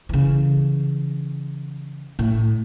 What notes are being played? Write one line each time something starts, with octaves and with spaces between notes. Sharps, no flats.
C#3 E3
A2